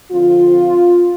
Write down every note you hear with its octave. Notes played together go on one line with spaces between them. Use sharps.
D3 F3 C4 F4